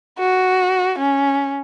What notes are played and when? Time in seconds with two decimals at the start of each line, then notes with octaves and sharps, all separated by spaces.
0.20 F#4
0.99 C#4